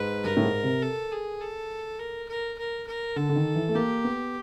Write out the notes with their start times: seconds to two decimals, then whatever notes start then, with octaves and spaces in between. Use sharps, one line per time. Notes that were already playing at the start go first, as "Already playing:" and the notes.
Already playing: G#2 B4
0.24 G2 A#4
0.37 A2
0.44 G#2
0.63 C3
0.82 A4
1.12 G#4
1.41 A4
1.99 A#4
2.29 A#4
2.58 A#4
2.87 A#4
3.16 D3 A4
3.29 D3
3.36 D#3
3.55 E3
3.69 A3
3.75 A#3 G4
4.04 B3